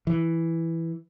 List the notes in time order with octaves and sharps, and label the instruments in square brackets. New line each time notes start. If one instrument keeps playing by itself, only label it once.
[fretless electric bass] E3